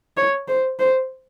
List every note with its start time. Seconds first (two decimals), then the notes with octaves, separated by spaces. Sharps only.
0.17 C#5
0.48 C5
0.79 C5